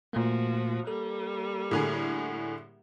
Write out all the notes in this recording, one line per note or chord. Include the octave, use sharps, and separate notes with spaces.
A#2 F3 A3 A#3 F#4
G3 A#3 A4
A2 D3 G#4